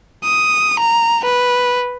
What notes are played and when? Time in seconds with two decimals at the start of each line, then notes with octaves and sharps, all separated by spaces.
0.24 D#6
0.80 A#5
1.25 B4